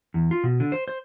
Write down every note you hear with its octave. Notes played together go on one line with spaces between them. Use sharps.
E2
F4
B2
D3
C5
C5